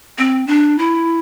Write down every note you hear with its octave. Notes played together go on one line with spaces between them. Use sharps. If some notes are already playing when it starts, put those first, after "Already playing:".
C4
D4
E4